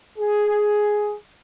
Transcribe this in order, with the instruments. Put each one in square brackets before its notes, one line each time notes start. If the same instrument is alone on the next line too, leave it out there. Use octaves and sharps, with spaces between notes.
[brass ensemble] G#4